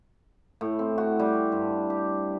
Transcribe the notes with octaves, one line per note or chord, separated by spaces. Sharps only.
A2
C4
F#4
G3
G2
G4